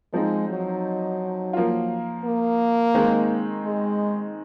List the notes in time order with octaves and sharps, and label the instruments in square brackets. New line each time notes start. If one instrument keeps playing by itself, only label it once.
[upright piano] F3 C4 D#4 [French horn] G#3
[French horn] F#3
[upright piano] F3 A#3 F4
[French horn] A#3
[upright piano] D#3 G#3 C4 D#4
[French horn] G#3